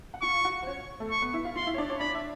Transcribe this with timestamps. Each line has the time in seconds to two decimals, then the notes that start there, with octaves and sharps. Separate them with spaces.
0.14 F#5
0.22 F4 F5 C#6
0.45 F#4 F#5
0.63 C5
0.67 C#4 C#5
1.00 A3 A4
1.11 C#6
1.22 B3 B4
1.33 E4 E5
1.45 F4 F5
1.56 F4 F5 C6
1.67 E4 E5
1.74 C#5
1.78 D4 D5
1.89 C#4 C#5
2.00 D4 D5 B5
2.15 E5